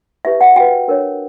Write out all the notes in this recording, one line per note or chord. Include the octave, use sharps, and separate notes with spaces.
E4 G4 B4 E5
F#5
F#4 B4 G5
D4 A#4 C#5